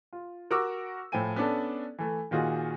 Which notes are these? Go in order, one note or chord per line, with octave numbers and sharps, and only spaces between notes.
F4
F#4 A#4 F#5 C#6 D6 E6
A2 F3 A4 G5 G#5 D#7
B3 C#4 D4 A4
E3 A3
A#2 D#3 F4 F#4 G#4